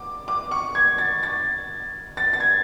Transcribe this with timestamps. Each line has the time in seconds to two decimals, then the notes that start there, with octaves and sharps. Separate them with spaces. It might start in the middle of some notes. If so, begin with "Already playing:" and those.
Already playing: D6
0.28 D6
0.51 C#6
0.75 G#6
0.98 A6
1.23 A6
2.17 A6
2.33 A6
2.40 G#6